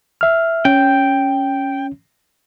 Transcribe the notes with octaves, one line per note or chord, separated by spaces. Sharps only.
E5 F6
C#4 G5